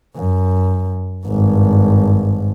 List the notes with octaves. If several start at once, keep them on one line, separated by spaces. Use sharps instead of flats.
F#2
G#1 G2